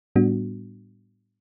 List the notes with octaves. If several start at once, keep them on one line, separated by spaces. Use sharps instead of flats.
A2 G3 B3 D4 F#4